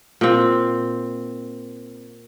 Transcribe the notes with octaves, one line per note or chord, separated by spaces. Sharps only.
A#2 C4